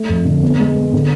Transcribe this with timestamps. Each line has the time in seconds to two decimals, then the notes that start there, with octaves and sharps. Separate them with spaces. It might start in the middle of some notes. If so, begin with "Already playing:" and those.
Already playing: A3
0.09 F2
0.25 D3
0.43 B3
0.59 G#3
0.76 B3
0.93 D3